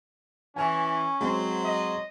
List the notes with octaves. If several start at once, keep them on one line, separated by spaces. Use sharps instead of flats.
E3 C#4 G#5
F#3 G#3 C4 C5
D#5